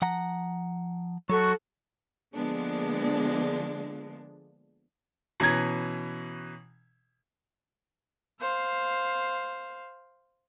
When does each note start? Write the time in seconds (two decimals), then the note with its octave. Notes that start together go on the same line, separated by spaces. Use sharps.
0.02 F3 F#5 A#5
1.30 F#3 F#4 A4 C#6
2.34 D3 F3 G#3 A#3 B3 D4
5.40 B2 E3 C#4 A#5 G#6
8.40 C5 F5